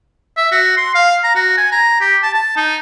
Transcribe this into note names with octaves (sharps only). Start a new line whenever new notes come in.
E5
F#4
C6
F5
A#5
F#4
G#5
A#5
G4
A5
A5
D#4